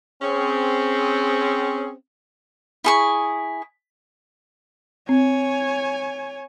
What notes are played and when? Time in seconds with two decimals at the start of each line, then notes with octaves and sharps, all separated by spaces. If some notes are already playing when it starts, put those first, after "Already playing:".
0.22 C4 C#4 G#4
2.84 E4 G#4 C#6
5.09 C4 C#5 G#5